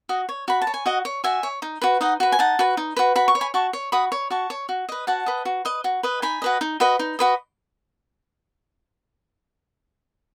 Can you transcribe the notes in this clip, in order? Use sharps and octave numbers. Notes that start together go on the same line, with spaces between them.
F#4 D#5
C#5
F#4 B5
A5
C#5
G#5
F#4 D#5 F#5
C#5
F#4 E5 G#5
C#5
D#4
F#4 B4
D#4 D#5 F#5
F#4 B4
G#5
D#4 F#5 A5
F#4 B4
D#4
F#4 B4
F#4 B5
C#6
C#5
G#5 B5
F#4 A5 C#6
C#5
F#4 B5 D#6
C#5
F#4 A5 C#6
C#5
F#4
B4 D#5
F#4 F#5 A5
B4 D#5
F#4
B4 D#5
F#4
B4 D#5
D#4 G#5 B5
F#4 B4 D#5
D#4
F#4 B4 D#5
D#4
F#4 B4 D#5